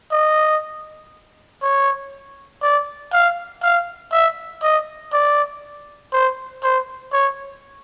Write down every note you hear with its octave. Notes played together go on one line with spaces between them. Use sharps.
D#5
C#5
D5
F5
F5
E5
D#5
D5
C5
C5
C#5